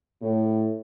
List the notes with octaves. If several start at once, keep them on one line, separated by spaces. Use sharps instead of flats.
A2